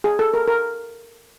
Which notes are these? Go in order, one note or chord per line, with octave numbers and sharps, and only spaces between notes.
G#4
A4
A#4
A#4